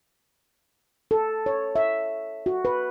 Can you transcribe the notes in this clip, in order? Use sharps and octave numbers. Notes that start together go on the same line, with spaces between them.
A4
C#5
E5
F#4
B4